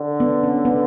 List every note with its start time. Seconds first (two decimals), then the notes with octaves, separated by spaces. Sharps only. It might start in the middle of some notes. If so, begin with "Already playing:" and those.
Already playing: D3
0.20 B3
0.43 C#4
0.65 B3